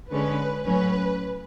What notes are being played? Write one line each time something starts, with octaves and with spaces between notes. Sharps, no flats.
D3 G#3 C#4 B4
A2 F#3 C#4 B4